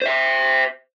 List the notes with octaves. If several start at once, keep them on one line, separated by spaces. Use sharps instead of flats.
C5 E5